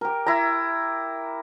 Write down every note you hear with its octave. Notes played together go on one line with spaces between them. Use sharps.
G4 A#4
E4 A#5